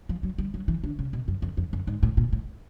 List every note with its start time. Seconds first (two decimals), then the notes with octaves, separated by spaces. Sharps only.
0.09 F3
0.23 F#3
0.38 G3
0.54 F#3
0.68 E3
0.84 D3
0.99 C#3
1.13 B2
1.28 F#2
1.42 F2
1.57 F2
1.73 F#2
1.87 G#2
2.03 A2
2.17 A#2
2.32 A2